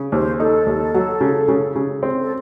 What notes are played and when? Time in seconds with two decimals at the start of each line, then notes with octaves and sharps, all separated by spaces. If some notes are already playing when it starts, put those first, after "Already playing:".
Already playing: C#3
0.12 D#2 C5
0.39 D#4 A4
0.66 D#2
0.94 F#3
1.21 C#3
1.48 C#3
1.76 C#3
2.03 C4
2.21 A4